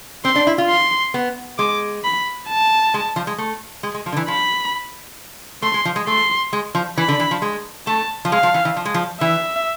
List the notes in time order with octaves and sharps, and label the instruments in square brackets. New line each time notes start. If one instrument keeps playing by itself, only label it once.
[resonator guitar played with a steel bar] C4 [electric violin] C6
[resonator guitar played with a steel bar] D4
E4
F4
[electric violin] C6
[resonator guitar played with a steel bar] B3
[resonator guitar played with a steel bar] G#3 [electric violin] D6
[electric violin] B5
A5
[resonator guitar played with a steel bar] G#3
F3
G#3
A3
G#3
G#3
F3
D3
E3
[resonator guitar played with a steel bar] F3 [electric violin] B5
[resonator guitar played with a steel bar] A3 [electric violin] C6
[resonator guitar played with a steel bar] G#3
F3
G#3
[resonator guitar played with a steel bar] A3 [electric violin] C6
[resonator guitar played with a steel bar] G#3
F3
[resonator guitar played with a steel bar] E3 [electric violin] B5
[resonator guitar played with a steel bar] D3
E3
F3
G#3
[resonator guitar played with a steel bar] A3 [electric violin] A5
[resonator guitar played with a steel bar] F3
[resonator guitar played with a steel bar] G#3 [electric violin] F5
[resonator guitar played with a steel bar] F3
E3
E3
F3
G#3
F3
[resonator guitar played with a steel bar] E3 [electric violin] E5